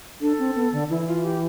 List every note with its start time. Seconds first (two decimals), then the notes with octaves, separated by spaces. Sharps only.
0.21 D4 A4
0.39 C4
0.56 B3
0.72 D3
0.89 E3 E4
1.07 F4
1.24 G4